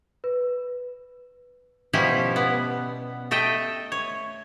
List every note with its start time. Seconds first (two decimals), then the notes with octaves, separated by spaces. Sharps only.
0.24 B4
1.93 B2 F3 G3 C#4 E4 G4
2.36 B3
3.31 A3 A4 D#5 E5 G5
3.92 C#5